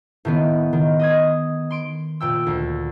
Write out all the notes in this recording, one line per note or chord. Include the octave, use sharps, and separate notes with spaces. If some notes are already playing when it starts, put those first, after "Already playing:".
A2 D#3 B3
D#3
D#5 D#6 G#6
C6 D7
A#2 G5 E6
D2